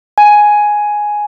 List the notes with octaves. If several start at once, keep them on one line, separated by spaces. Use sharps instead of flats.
G#5